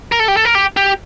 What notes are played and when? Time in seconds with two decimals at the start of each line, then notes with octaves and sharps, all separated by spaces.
0.12 A#4
0.20 A4
0.28 G4
0.37 A4
0.45 A#4
0.55 G4
0.77 G4